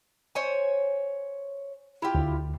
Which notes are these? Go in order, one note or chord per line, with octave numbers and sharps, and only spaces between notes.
C5 C#5 G#5
E4 F4 G4
D2